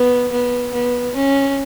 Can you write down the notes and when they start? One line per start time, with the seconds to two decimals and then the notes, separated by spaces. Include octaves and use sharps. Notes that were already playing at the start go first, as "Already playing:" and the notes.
Already playing: B3
0.31 B3
0.73 B3
1.16 C#4